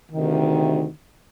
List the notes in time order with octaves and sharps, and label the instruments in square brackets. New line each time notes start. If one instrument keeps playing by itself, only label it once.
[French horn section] D2 C3 D#3